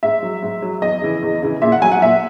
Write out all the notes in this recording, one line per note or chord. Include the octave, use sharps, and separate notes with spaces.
G#2 E5
F#3
G#2
F#3
E2 D#5
C#3 E3
E2
C#3 E3
A#2 E5
F#5
F#3 G#5
F#5
A#2 E5